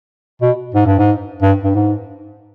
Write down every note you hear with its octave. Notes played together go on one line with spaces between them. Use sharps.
B2
G#2
G2
G#2
G2
G2
G#2